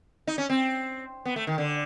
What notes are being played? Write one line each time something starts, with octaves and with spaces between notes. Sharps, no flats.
D#4
C#4
C4
B3
A3
D#3
D3